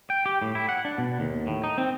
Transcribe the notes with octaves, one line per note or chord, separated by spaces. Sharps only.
G5
G4
A2
E4
F#5
D4
B2
D#2
A2
D#4
C4